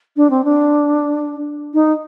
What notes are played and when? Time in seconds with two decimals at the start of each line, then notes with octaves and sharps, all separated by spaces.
0.16 D4
0.30 C4
0.44 D4
1.74 D#4